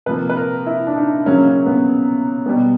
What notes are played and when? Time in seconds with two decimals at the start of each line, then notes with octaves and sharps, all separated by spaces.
0.06 C3 F3 A#3 B4
0.29 B4
0.37 A#4
0.66 E4
0.87 D4
0.96 D#4
1.26 C#3 F#3 A#3 C#4
1.47 C#4
1.66 B3
2.46 B2 G3 B3